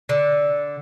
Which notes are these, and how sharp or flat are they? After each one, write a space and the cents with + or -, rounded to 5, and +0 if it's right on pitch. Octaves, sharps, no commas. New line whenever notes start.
D3 -10